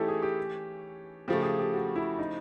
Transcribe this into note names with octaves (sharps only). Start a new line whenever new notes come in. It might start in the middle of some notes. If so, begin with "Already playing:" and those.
Already playing: E3 A3 C#4 D#4 E4 G4 A4
G#4
G4
C#3 F3 A3 G4
G#4
G4
F#4
E4
D#4